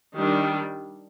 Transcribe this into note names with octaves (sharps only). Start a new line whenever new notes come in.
D#3 G3 D4